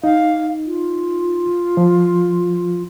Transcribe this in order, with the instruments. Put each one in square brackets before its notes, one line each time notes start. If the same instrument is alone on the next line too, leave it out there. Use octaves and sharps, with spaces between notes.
[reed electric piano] D#4 [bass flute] F5
[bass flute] F4
[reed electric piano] F3